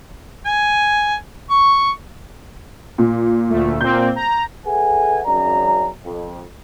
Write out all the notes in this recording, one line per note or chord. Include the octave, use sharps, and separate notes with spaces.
G#5
C#6
A#2
D2 A3
A#2 A#3 C4 G6
A#5
G#4 A4 B4 E5 F#5 G#5
G#1 F#2 C#3 D5 A#5
F2